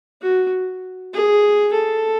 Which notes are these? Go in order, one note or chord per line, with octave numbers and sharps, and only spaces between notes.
F#4
G#4
A4